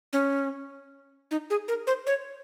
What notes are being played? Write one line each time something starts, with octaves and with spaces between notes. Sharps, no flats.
C#4
D#4
G#4
A#4
C5
C#5